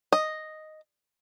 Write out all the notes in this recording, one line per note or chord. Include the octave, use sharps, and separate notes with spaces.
D#5